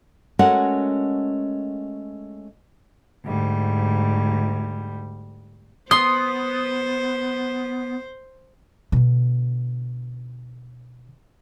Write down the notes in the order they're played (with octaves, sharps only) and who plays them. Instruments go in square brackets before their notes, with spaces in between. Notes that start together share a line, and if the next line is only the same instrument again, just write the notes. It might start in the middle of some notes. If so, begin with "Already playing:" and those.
[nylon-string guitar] G#3 A3 C#4 F#4 A#4 F#5
[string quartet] D2 G#2 G3
[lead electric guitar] B3 [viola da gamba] C5 [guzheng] C6 [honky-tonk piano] D#6
[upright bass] B2 D3